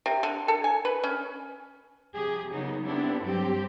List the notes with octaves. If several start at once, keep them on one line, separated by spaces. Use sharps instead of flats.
C3
D3
A4
G#5
B4
C#4
C3 F3 G4 G#4
C#3 F#3 A#3 B3 D#4
B3 C4 D4 E4 G4 A4
G2 F#3 G3 C4 G4